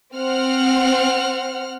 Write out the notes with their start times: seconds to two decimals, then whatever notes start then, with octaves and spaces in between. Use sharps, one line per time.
0.15 C4 C5 F#5 F6